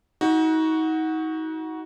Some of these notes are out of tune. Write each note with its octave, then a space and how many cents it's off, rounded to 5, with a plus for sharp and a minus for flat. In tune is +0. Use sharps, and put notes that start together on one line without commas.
D#4 +35 F#4 +0